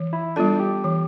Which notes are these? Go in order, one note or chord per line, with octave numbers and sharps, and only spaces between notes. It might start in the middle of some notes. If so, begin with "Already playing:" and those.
Already playing: E3
E4
G3 B3 D4 F4 A4
G4
E3